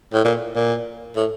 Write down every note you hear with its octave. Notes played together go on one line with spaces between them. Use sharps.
A2
A#2
A#2
A2